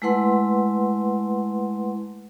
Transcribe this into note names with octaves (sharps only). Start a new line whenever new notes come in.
G#3 A3 E4 B4 F#5 C6